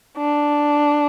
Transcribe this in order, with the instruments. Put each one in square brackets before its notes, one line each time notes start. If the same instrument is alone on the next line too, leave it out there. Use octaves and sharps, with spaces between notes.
[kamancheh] D4